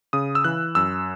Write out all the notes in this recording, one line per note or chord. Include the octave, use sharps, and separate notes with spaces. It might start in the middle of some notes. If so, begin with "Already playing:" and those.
C#3 D#6
E6
E3 F#6
F#2 E6